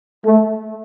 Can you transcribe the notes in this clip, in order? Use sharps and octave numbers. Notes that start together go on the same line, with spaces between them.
A3